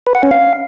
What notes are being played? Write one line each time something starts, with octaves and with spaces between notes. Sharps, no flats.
B4
F#5
C#4
F5